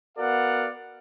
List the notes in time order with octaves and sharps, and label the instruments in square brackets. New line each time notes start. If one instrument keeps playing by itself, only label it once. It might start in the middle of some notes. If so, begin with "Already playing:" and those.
[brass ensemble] B3 F#4 A#4 D5 F5 F#5